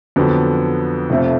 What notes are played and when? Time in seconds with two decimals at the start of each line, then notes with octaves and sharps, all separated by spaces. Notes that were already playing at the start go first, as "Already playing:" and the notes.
0.16 F2 D3 F#3 B3
1.10 F1 F2 C3 F3 A3